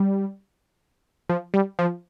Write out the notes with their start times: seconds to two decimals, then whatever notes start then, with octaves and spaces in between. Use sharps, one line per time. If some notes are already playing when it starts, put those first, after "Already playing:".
Already playing: G3
1.29 F3
1.54 G3
1.79 F3